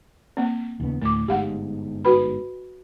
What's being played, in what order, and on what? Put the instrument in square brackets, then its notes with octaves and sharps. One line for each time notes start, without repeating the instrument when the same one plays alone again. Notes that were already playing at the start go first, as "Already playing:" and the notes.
[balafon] A#3 C4
[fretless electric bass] D#2 C#3 B3
[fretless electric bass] D2 A2 [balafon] A3 D6
[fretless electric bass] G1 G#2 [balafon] G4 F5 F#5
[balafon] F#4 B4 B5